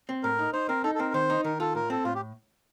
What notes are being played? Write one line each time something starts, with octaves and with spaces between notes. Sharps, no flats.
C4
A2 A#4
D#4
D#4 C5
C4 A#4
D#4 A4
A4
C4 A#4
D#3 C5
D#4
D#3 A#4
F4 A4
A2 A#4
C4 A4
A2 F4
G4